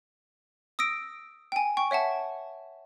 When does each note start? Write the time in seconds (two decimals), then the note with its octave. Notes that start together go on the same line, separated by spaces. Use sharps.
0.79 D#6 E6 A#6 D7
1.52 G5 G#5
1.77 G5 C#6
1.91 C#5 E5 F#5 A5